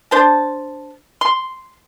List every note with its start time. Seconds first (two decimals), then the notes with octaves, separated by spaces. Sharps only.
0.11 D4 C5 A5
1.21 C6